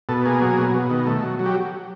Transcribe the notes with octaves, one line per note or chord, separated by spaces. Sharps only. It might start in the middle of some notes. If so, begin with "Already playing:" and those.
B2 A4
A#3 G#4
F#3
B2
B2
D#3
A3
F#3
F#3
G4